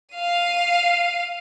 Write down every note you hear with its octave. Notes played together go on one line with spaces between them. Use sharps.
F5 D#7